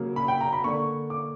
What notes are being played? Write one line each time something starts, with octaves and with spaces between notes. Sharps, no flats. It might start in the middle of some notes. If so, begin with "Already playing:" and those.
Already playing: C#3 F#3 A#3
B5
G5
A#5
B5
D3 A#3 C#6
D6